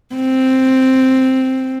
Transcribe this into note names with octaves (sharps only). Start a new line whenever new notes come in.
C4